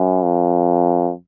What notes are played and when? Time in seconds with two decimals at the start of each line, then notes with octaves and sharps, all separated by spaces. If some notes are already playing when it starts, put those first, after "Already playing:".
Already playing: F#2
0.22 F2